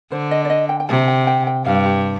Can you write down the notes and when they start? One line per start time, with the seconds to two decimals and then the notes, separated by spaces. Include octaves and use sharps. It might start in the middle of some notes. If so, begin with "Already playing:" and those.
0.12 D3 C5
0.31 D#5
0.45 D5
0.50 D#5
0.69 G5
0.80 G5
0.89 C3 A5
1.08 G5
1.27 G5
1.47 G5
1.65 G2 F5
1.86 G4